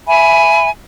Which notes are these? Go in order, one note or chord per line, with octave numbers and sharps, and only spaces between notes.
E5 G#5 B5